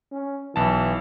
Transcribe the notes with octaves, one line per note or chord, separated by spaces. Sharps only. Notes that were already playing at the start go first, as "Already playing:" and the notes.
C#4
B1 E3 A5